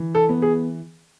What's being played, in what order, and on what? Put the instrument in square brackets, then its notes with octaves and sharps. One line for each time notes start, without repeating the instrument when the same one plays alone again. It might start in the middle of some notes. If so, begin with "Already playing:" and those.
Already playing: [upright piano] E3
[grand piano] A4
[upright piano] B3
[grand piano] G#4